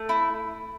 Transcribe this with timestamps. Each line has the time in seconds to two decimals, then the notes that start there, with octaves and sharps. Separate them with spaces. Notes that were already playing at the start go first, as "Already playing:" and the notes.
Already playing: A3
0.09 E4